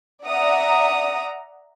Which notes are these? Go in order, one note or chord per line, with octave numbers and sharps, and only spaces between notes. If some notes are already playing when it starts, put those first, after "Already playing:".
D5 E5 F#5 A#5 D#6